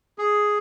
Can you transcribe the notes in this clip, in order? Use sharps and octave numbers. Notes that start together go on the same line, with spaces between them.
G#4